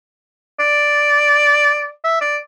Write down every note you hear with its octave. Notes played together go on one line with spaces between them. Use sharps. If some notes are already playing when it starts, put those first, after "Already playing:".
D5
E5
D5